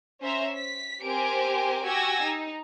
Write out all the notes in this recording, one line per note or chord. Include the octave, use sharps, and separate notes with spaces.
C#4 C5 E5 A#5
B6
C4 G4 A#4 C5 G#5 D7
F#4 G4 G#5 E6 G#6 A#6
D#4